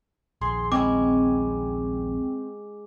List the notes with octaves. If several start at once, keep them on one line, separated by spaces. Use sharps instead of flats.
A#1 D#2 G#4 C6
G#3 C4 C#4 E4 D6